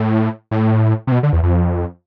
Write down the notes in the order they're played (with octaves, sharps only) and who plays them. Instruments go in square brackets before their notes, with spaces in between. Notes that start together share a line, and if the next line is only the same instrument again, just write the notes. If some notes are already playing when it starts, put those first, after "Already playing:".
Already playing: [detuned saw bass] A2
A2
C3
B2
D3
E2
F2